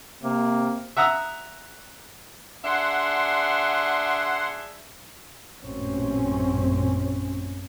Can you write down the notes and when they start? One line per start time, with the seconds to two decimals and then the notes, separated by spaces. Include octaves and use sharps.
0.23 C3 A#3
0.97 E5 F#5 A#5 D#6 E6
2.65 D4 G#4 E5 F#5 C6
5.62 A1 F#2 A#2 C4 C#4